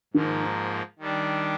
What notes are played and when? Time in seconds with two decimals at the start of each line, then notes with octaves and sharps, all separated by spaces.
0.14 G#2 D#3 F3 A#3
0.99 D#3 G3 D4